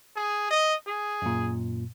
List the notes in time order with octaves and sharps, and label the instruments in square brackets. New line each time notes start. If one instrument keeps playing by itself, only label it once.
[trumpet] G#4
D#5
G#4
[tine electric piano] F#2 A#2